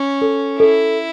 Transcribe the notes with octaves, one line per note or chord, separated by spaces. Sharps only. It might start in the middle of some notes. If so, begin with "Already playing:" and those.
Already playing: C#4
A4
E4 A4